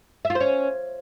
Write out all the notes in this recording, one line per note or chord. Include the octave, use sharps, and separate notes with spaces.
E5
F4
C5
C#4